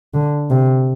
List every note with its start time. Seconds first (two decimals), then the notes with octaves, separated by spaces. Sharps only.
0.14 D3
0.50 C3